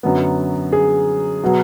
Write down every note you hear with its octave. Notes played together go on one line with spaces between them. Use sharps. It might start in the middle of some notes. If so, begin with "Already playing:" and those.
F#2 D3 F#3 B3
G#4
B2 F#3